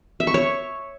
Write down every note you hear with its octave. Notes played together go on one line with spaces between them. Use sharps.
E5
C#6
C#5